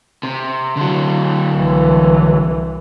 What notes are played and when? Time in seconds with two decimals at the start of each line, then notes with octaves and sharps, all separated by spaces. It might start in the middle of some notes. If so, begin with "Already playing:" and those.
0.23 C3
0.77 D3 F#3
1.55 C2 E3